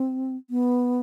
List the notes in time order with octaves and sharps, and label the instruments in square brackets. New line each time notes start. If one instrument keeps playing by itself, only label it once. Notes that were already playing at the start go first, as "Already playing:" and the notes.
Already playing: [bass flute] C4
B3